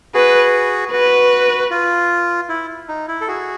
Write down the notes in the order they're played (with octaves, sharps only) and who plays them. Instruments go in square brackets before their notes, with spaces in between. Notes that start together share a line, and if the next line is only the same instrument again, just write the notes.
[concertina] F#4 G#4 [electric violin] B4
[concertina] F#4 [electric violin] B4
[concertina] F4
E4
D#4
E4
A4
F#4 G#4